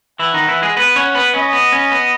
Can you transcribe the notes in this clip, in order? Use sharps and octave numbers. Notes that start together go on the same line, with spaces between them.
E3 E4 F#5
D#3 D#4
E3 E4
G#3 G#4
B3 B4 F#5
C#4 C#5
B3 B4
C#4 D#5
B3
C#4
B3